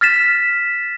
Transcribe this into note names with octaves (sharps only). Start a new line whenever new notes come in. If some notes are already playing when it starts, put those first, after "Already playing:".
F6 A6 B6 E7